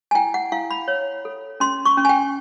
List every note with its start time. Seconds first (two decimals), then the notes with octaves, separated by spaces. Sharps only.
0.11 G#5
0.15 E4 G5
0.34 F#5
0.52 E4 F5
0.71 B5
0.88 C#5
1.25 A4
1.60 C#4 C6
1.85 C#6
1.97 C#4
2.05 G#5
2.09 G5